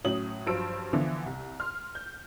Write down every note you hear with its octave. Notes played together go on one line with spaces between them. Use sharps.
A2 F#3 C#4 D#6 F#7
G2 F3 F#3 C5 E6 D7
D3 E3 F3 B3
C2
C6 F6
G6